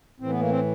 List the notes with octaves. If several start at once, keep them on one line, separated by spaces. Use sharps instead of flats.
A2 E3 C4
B3
A#3
C4